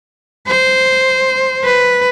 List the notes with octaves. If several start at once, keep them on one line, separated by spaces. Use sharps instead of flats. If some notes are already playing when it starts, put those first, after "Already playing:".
C5
B4